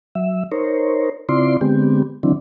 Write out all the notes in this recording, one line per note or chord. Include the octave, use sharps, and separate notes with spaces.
F#3 E5
D#4 A#4 C5 C#5
C#3 C4 E4 F4 D5 C6
D3 G#3 B3 C4 G4
D3 D#3 F#3 C4 D4 E4